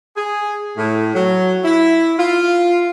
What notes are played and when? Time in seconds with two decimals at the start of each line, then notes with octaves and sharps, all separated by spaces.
0.17 G#4
0.77 A2
1.15 F#3
1.65 E4
2.19 F4